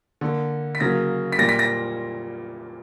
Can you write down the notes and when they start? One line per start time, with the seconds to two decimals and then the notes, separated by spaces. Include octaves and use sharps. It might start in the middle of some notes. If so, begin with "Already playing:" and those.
0.21 D3 A#3
0.75 B6
0.80 C#3 F#3 A#3 A#6
1.32 B6
1.39 A#2 G3 A#3 A#6
1.49 B6
1.59 A#6